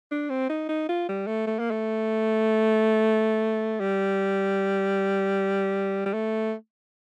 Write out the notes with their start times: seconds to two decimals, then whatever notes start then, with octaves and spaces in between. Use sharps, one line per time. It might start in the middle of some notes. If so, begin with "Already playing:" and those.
0.11 D4
0.30 C4
0.49 D#4
0.68 D#4
0.89 F4
1.08 G3
1.27 A3
1.47 A3
1.59 A#3
1.71 A3
3.80 G3
6.06 G3
6.13 A3